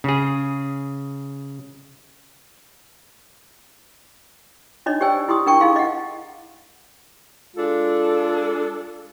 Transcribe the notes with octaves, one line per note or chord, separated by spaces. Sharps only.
C#3 G#4
D4 D#4 C#5 D#5
G4 C5 D5 G5 G#5 E6
E4 G4 C6 D#6
D4 A#4 G5 A5 C#6
D#4 E4 G#4 F5 C6
D#5 F#5
G#3 D4 F4 A4